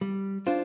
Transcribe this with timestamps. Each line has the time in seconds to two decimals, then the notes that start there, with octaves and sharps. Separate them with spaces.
0.01 G3
0.47 D4 F4 C5